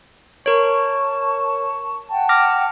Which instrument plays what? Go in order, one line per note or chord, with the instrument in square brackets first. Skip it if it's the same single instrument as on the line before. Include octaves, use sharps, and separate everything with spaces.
[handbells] A#4 C#5 [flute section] A5 C#6
[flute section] F#5 G5 A5
[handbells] D6 F6 A#6